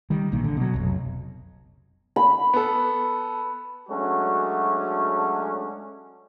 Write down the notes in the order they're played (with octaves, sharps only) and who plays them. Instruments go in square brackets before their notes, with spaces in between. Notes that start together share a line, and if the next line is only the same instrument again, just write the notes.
[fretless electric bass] D#3 G3
A#1 A#2 D#3
D3
B2 F#3
F1 B1
[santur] B5
[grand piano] B3 A4
[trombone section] F#3 G#3 A3 C#4 D4 F#4